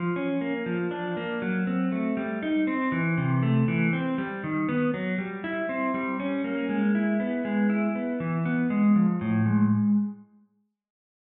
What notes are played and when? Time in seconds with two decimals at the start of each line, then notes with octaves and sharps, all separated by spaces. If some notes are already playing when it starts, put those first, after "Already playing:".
Already playing: F3
0.16 C#4
0.41 A#3
0.66 F3
0.91 D4
1.17 A#3
1.42 F#3
1.67 C4
1.92 A3
2.17 G3
2.42 D#4
2.67 C4
2.92 E3
3.17 C3
3.43 A3
3.68 E3
3.93 C4
4.18 G3
4.44 D#3
4.69 B3
4.94 F#3
5.18 G3
5.44 E4
5.69 C4
5.94 G3
6.20 C#4
6.44 A#3
6.69 G#3
6.95 E4
7.20 B3
7.45 G#3
7.70 E4
7.95 B3
8.20 E3
8.45 B3
8.70 G#3
8.96 F3
9.21 A2
9.46 G#3